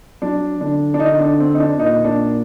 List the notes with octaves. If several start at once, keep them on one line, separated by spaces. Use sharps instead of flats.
F#3 D4
D3 D4
D4
D3 D#4
D4
C4
D#4
D4
A#2 D#4
D4